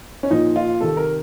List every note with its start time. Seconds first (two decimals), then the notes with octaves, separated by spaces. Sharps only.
0.23 C#4
0.30 A#2 F3 D#4
0.56 F4
0.80 C3 D#3 A4
0.97 A#4